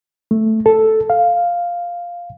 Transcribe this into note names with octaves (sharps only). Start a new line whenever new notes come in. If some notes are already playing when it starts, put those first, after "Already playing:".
A3
A4
F5